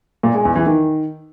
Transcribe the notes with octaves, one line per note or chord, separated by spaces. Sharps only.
A#2
G#3
E2
E3
D#3